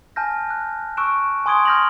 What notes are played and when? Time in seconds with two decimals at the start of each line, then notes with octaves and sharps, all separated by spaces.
0.16 G#5 A5 F6 G6 A#6
0.50 F#6
0.97 C#6 E6 F#6 D7 E7
1.46 G#5 C6 D#6 G#6 D7 G7
1.65 F6 G6 A#6 F7 F#7